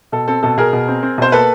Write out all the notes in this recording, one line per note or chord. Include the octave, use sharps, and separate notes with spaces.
B2 A4
C4 A4
B2 A4
B2 G#4 A#4
B2
C4
C4
B2 C5
A#3 A4 B4